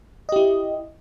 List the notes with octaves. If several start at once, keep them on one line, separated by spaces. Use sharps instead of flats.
E4 G4 D#5